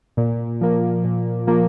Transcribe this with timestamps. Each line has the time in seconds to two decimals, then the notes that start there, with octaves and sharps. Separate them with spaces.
0.17 A#2
0.61 F3 A#3
1.04 A#2
1.47 F3 A#3